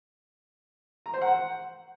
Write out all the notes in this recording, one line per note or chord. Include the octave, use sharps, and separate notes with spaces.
A#5
C5
F#5